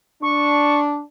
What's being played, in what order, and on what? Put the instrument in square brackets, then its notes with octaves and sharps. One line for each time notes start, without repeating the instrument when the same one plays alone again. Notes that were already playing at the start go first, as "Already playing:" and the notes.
[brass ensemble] D4 [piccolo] C#6